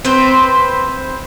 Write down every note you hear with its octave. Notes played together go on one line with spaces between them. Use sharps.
C4 B4 C5